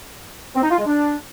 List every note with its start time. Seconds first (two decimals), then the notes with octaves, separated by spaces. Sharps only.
0.55 C4
0.63 D#4
0.71 F4
0.78 G#3
0.86 D4